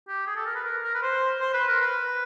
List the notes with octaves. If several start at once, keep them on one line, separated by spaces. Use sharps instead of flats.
G4
G#4
A4
A#4
B4
A#4
A#4
B4
C5
C5
B4
A#4
B4